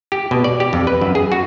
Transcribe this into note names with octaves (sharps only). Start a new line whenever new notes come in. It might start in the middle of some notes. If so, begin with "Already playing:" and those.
G4
B2
D5
G4
F2
B4
F#2
G#4
F#4